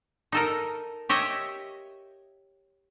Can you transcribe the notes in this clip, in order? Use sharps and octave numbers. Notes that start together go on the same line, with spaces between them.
D#4 A4 A#4
G4 C#5 D#5 E5